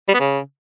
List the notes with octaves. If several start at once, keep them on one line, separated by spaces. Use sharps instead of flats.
G3
B3
C#3